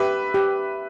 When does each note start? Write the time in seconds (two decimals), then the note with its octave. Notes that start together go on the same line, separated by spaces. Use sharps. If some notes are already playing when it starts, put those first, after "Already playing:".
Already playing: G4 B4 E5
0.34 G4